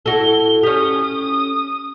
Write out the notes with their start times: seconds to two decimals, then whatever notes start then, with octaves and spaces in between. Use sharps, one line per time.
0.06 E4 F#4 A4 G7
0.63 C#4 G4 D#6